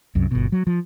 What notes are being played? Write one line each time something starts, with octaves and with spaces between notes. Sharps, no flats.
C2 F#2
G1 B2
F#3
F3